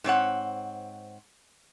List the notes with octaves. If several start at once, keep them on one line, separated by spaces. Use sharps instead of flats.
G#2 C4 C#5 F#5